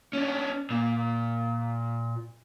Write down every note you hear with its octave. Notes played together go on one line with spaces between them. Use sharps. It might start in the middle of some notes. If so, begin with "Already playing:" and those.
C#4 D4
A#2